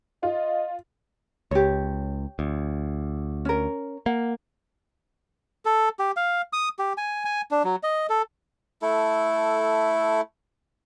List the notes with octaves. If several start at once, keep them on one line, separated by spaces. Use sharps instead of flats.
F4 D#5
C#2 G4 C#5
D2
C#4 A#4
A#3 F#5
A4
G4
F5
D#6
G4
G#5
G#5
D4
F#3
D#5
A4
A3 E4 A4